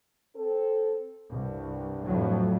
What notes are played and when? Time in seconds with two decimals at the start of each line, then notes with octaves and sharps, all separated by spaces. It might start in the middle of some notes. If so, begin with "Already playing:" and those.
0.35 C4 A4
1.31 C2 G2
2.06 F2 A2 F#3